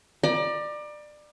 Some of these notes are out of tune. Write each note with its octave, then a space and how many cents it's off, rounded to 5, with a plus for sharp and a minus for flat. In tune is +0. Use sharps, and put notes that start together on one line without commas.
D5 +25 A#5 +35